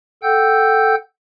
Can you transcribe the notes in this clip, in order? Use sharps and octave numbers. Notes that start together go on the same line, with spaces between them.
A4 F#5 G5 E6 G6